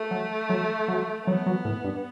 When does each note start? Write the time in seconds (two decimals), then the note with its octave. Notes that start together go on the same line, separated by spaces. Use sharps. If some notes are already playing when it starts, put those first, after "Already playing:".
Already playing: A3
0.11 F#3
0.49 F#3
0.88 F#3
1.26 F#3 B3
1.46 F#3
1.65 A2
1.84 G2